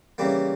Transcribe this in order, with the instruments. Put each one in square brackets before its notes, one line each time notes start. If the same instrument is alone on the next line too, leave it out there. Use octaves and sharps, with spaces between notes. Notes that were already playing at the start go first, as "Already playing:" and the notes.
[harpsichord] C#3 E3 G3 A#3